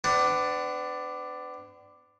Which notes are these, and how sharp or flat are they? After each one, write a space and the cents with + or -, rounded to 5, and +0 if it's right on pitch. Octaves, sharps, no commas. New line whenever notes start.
B3 +40 D4 +5 F#5 +0